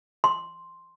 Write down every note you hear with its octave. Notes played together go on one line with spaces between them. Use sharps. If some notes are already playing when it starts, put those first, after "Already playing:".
C6